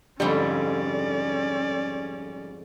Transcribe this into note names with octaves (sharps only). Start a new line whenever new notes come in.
F2 G#2 D3 G3 C#4 D5